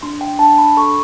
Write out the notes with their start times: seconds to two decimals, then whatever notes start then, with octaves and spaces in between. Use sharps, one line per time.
0.03 D4 C6
0.21 G5
0.39 D4 A5
0.58 B5
0.77 A4 C#6